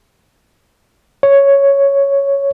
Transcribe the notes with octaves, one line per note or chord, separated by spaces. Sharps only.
C#5